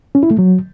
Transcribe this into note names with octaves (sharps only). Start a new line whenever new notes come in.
C#4
E4
A3
F#3